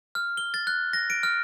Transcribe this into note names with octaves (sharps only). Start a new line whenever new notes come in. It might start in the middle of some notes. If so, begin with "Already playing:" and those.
F6
G7
A6
F#6
A#6
D7
F6